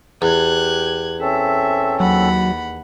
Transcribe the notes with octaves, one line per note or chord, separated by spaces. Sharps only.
E2 G4 F#6 G#6
C4 C#4 A4 E5
D#2 F#3 F#5 B5